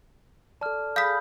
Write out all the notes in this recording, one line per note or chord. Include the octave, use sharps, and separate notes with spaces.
A4 D5 A5 F6
G#4 F5 B5 D#6 G6 B6